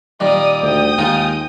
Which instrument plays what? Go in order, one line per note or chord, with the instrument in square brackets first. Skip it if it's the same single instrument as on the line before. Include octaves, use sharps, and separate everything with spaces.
[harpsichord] A#2 D#3 G3 [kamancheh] D6 D#6
[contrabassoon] D2 [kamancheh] G5 D#6
[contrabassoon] D#2 [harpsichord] G#3 D#4 F4